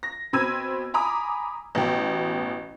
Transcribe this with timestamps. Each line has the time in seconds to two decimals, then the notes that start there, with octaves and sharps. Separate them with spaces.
0.03 A#6
0.33 B2 C4 B5 E6 G#6 D#7
0.94 G#5 A#5 B5 D6 D#6
1.75 A1 B2 G5